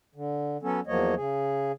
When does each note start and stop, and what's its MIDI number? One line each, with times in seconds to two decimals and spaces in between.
0.15 0.57 50
0.63 0.80 54
0.63 0.80 59
0.63 0.80 61
0.63 0.80 69
0.87 1.15 40
0.87 1.15 53
0.87 1.15 54
0.87 1.15 58
0.87 1.15 73
0.87 1.15 75
1.16 1.72 49
1.16 1.72 68